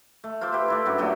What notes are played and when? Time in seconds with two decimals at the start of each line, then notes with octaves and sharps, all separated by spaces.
0.24 A3
0.41 F4 C5 E5 D6
0.53 G4 B4
0.68 A3 D4 E4
0.85 F#2 G3 D4 F#4
0.98 A#2 F#3 A3 G4